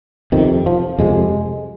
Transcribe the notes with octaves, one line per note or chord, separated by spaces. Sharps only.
F2 C3 D#3
F3
F2 C3 G#3